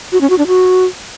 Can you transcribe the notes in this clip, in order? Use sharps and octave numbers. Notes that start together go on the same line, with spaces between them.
F#4
C#4
F#4
D4
F#4